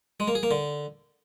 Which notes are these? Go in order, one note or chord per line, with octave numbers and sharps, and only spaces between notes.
G#3
A#3
G#4
A#3
D3